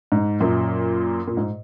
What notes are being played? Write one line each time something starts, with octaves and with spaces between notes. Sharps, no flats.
G#2
F#2 A#2
A#2
G#2